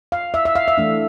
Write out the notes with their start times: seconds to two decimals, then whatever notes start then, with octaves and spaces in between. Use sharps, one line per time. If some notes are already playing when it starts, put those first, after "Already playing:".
0.12 F5
0.34 E5
0.45 E5
0.55 F5
0.68 E5
0.78 E3 A3 D4